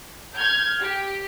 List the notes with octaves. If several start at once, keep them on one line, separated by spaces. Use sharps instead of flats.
F6 G6 G#6
G4